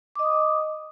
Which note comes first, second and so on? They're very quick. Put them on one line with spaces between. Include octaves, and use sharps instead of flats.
D6 D#5 D#6